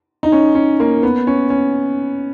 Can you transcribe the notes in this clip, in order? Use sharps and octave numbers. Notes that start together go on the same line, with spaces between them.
D#4
C#4
C#4
A#3
B3
C#4
C#4